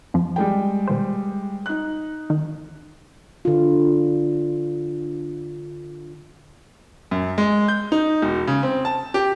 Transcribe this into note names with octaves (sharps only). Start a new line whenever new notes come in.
F2 F3
G3 G#3 G5
B2 D#3 C5
D#4 F#6
D#3
D3 F4
F#2
G#3
G6
D#4
E1
C#3
C4
A5
G4